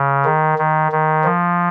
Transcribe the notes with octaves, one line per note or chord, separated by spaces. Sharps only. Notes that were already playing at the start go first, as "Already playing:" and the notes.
Already playing: C#3
D#3
D#3
D#3
F3